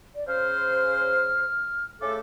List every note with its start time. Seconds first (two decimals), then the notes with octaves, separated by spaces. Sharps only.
0.15 D5
0.27 C#3 C5 F6
2.01 C#3 A3 A4 D6